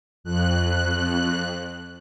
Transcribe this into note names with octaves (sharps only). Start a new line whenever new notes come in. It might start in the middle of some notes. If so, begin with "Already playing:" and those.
F2 F#6